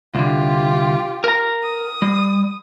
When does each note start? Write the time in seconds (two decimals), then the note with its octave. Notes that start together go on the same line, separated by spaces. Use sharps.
0.15 C2 D3 F4 G4
1.24 A#4 A#5
1.63 D#6
2.02 G3